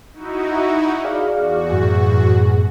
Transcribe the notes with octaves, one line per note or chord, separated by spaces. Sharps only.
D#4 E4 F#4
G#4 D5 F5
E2 F#4
F#2 A2 G#4